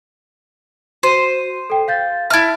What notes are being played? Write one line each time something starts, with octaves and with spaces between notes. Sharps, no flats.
F#4 C5 D#7
A4 G5
F5 G6 A6
E4 E5 A5 F6 A6